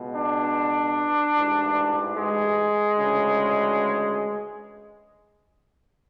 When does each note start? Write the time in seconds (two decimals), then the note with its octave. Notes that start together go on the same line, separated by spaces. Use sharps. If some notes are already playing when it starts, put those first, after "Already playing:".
Already playing: C#2 B2
0.15 D4
1.36 A1 G#2 E3
2.16 G#3
2.96 D2 C#3 E3